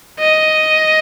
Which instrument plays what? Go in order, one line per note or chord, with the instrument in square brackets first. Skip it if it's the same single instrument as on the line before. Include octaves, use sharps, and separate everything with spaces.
[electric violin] D#5